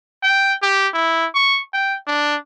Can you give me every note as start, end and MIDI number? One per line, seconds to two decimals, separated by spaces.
0.23 0.54 79
0.62 0.88 67
0.94 1.27 64
1.35 1.62 85
1.73 1.96 79
2.07 2.37 62